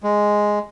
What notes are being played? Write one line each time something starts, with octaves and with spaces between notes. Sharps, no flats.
G#3